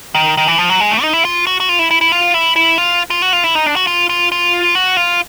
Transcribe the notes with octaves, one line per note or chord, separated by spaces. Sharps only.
D#3
D#3
E3
F3
F#3
G#3
A3
D#4
E4
F4
F#4
F#4
F4
E4
E4
E4
F4
E4
E4
F4
F4
F#4
F4
E4
D#4
D4
F#4
F4
F4
F4
F#4
F4